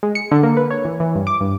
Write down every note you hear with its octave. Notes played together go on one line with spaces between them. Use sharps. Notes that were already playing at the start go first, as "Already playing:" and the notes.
G#3
C#7
D3
A#3
B4
C#5
E3
E3
G2
D6
G2